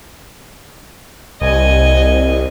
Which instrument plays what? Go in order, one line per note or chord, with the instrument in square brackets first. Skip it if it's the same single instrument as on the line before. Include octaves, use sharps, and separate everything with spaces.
[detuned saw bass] C2 [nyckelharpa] D#5 G#5